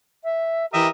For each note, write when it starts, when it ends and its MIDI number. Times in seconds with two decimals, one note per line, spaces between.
0.23 0.65 76
0.73 0.87 52
0.73 0.87 67
0.73 0.87 70
0.73 0.88 75
0.73 0.87 76